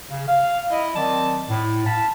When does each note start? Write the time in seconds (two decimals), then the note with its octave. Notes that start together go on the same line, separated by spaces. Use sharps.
0.09 C#3
0.28 F5
0.71 E4 D#5
0.95 D#3 F#3 C4 D5 D#5 A5
1.49 A2
1.86 F5 A5 B5